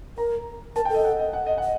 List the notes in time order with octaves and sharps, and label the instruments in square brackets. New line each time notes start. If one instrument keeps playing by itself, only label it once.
[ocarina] A#4 [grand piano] A#5
[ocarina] A#4 [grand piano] A5
[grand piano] G5
[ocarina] A4 [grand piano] D#5
[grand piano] F#5
D#5
F#5
D#5
F#5
[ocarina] D#5